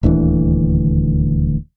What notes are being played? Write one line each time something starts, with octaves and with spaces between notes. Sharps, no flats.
D#1 D2 D3 E3